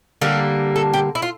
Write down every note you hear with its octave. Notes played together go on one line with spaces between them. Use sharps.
D3 G3 A#3 A#4
A4
G4
E4
F4